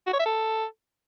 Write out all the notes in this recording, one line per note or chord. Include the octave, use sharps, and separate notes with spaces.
F#4
C#5
E5
A4